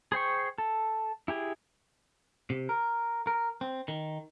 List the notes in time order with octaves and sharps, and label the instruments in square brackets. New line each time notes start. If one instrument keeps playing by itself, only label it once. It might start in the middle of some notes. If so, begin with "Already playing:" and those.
[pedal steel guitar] G#4 C5 G5 C#6
A4
E4 G4 G#4
[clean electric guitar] C3
A#4
A#4
C4
D#3